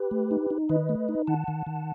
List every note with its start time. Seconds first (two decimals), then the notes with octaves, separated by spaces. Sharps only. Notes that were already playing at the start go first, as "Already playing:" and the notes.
Already playing: G4 B4
0.11 A3
0.31 D#4
0.50 D#4
0.69 D#3 B4 D#5
0.89 A3
1.09 D#4
1.27 D#3 F#5 A5
1.48 D#3
1.66 D#3